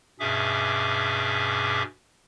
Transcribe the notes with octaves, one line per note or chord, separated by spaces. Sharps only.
G2 B2 C#4 G#4 E5 D6